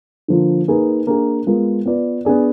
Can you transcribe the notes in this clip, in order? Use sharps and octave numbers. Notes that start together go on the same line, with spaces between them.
D3 F3 A#3 F4
A#3 D#4 G#4 B4
A#3 D4 G#4
G#3 B3 F4 A#4
B3 F4 B4 D5
B3 D4 G#4 D5